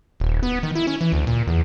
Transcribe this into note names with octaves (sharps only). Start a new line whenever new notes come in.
D#1
B3
D#3
E4
C#4
E3
D2
A#2
E2